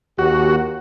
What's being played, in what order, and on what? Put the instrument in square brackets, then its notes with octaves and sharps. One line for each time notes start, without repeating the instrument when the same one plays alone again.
[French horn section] D#2 G4 [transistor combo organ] F#4